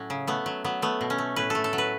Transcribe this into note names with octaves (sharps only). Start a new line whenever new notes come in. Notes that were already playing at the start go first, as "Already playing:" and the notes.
Already playing: A2 F#3 C#4
C#3
A3 B3
F#3
F#3 B3
A3 B3
B2
C#4
A3
A2 B4
A3 A4
A4
F#3
B4